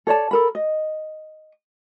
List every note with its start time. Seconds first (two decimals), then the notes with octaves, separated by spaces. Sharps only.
0.07 A4 C#5 D5 A5
0.31 A4 A#4 B5
0.55 D#5